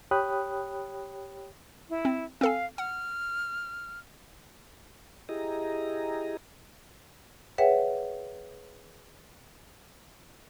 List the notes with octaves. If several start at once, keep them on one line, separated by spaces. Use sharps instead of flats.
G4 C#5 G5 B5 D#6 F#6
E4
C4
C4 A4 F5 G#5
F#5 F6
E4 G4 G#4 D#5 A#5
G#4 B4 C#5 E5 F#5 G5